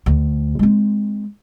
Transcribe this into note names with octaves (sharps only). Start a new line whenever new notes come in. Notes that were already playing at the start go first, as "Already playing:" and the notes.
D2
G#3 C4